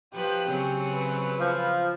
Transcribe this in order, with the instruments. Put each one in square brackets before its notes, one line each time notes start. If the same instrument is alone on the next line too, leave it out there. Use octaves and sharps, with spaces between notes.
[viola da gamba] F3 B4 [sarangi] G4
[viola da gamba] C#3 F#3 C4
[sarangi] B4
[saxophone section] F3